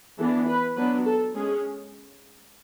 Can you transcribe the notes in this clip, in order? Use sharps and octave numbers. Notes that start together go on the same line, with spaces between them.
E3 B3 D4 A4
B4
F#3 B3 D4 B4
A4
G#3 C#4 G#4